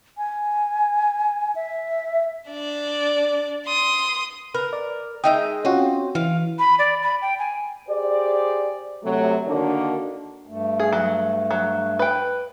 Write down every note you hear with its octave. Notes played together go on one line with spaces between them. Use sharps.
G#5
E5
D4 D5
C6 D#6
A#4 B4
D5
G#3 D#4 E5 G5 D#6
C4 C#4 F4 F#4
E3 F5
B5
D5
B5
G5
G#5
G4 G#4 C5 D5
C3 F#3 A3
D3 D#3 A#3 D4 F#4 A#4
G2 A3
G#4
F#3
F#3
B4 G5